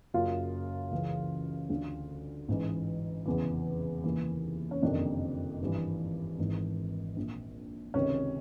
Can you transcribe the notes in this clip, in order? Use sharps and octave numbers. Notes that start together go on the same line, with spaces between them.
F#1 F#2 C#3 F4
C#2 C#3 E3
D2 D3
A1 G#2 E3
F1 E2 C#3 E3
F1 D#2 C#3 E3
C#4
F#1 F2 C3 D#3 D4
G#1 G2 E3
G#1 G#2 E3
A#1 A#2
C#2 C3 D#3 C#4